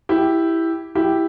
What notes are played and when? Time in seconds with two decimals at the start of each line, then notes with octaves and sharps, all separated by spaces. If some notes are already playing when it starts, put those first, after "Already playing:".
0.09 E4 G4
0.95 E4 G4